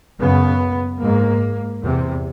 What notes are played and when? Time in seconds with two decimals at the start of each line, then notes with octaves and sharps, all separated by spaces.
0.20 F#2 C#3 B3
1.01 G#2 A#3
1.82 E2 C3